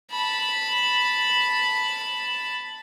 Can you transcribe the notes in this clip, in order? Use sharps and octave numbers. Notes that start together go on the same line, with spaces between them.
A5 B5